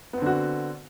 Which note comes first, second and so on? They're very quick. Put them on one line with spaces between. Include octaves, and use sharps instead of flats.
B3 C4 D3 F#4